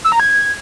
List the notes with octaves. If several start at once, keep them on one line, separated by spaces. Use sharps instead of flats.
E6
A#5
G#6